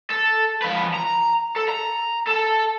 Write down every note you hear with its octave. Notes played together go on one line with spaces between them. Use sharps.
A4
F3 B4
A#5
A4
A#5
A4 A5